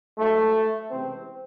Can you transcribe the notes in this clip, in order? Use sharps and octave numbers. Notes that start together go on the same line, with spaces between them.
G#2 F#3 A3
C#2 C3 E3 C4